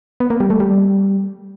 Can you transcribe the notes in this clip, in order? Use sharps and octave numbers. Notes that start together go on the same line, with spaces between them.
B3
A#3
G3
A3
G3